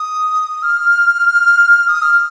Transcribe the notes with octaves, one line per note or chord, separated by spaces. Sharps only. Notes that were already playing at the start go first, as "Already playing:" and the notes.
Already playing: D#6
F6
D#6
F6